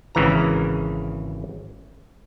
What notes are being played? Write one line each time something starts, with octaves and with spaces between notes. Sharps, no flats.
G#1 C#3 E3 A#5